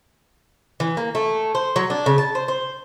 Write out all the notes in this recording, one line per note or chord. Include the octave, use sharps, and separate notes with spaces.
E3
A#3
A3
C5
F#3
D4
C#3
A5
C5
C5